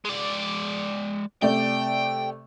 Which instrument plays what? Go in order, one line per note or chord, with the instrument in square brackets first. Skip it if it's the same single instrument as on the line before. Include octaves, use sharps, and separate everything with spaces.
[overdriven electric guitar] G#3 D5
[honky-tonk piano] C3 A3 D5 [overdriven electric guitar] G5